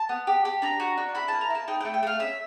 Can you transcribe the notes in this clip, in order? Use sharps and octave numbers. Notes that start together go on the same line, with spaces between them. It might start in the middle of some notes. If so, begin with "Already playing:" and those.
Already playing: A5
B3
G4
G4
D4 A#5
F#4
D4
E4 B5
A#3 A5
A#5
E4 A5
D#4 G5
G5
A3
G5
A3 F5
C#4 E5